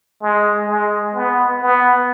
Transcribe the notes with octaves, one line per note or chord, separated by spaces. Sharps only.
G#3
G#3
B3
B3